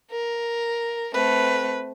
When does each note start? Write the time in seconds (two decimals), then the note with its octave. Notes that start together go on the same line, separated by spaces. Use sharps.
0.11 A#4
1.14 A3 C4 B4